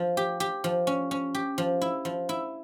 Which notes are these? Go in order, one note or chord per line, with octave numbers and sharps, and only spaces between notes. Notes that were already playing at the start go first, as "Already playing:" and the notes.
Already playing: F3
G4
G4
F3
C#4
C#4
G4
F3
E4
F3
E4